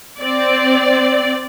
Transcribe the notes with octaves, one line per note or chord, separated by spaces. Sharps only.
C4 D5